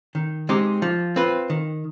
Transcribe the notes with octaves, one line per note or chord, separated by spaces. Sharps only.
D#3
G#3 C4 D#4 G4
F3
C4 F4 B4
D#3